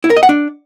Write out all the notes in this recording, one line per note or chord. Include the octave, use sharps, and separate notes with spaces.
E4
A#4
D#5
F#5
D4